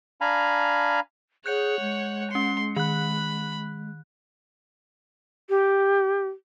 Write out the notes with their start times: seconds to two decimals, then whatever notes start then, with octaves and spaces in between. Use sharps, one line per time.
0.21 D4 F5 G#5 A#5 B5
1.46 G#4 C#5 F#5 F#6 G6 C#7
1.81 G#3
2.31 C#4 C6 C#7
2.76 D#3 B5 F#6
5.49 G4